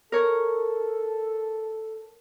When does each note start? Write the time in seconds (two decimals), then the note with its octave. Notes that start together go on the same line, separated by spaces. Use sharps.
0.12 A4 A#4 C#5